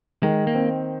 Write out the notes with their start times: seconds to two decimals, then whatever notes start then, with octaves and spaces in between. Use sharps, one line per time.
0.23 D#3 G#3
0.47 A#3
0.54 C4